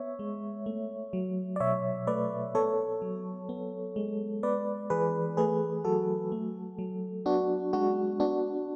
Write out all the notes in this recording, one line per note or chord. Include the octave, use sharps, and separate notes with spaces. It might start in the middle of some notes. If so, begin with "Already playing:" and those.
Already playing: B3 C#5 E5
G#3
A3
F#3
D5
B2 C#5 E5
A3 B4 D5
B3 A4 C#5
F#3
B3
G#3
B3 B4 D5
E3 G#4 B4
A3 G#4 B4
F#3 F#4 A4
A3
F#3
B3 D4 F#4
G#3 D4 F#4
B3 D4 F#4